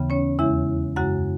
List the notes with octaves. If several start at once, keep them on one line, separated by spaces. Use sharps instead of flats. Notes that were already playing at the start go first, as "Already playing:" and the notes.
Already playing: D#2 C#3 E3 B3
C#4 C#5
E2 C#3 G#3 E4 E5
F#2 C#3 G#3 F#4 F#5